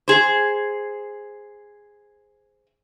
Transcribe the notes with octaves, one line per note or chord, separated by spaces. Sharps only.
G#4 C5